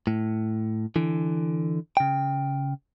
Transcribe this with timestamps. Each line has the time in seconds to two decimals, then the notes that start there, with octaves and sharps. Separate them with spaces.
0.07 A2
0.96 D3 E3
1.97 C#3 G5